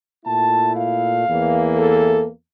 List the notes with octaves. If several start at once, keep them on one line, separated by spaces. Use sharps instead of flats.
A#2 A3 E4 A5
F5
E2 E3 A#3
A4